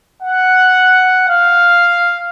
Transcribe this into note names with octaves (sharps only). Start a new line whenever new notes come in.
F#5
F5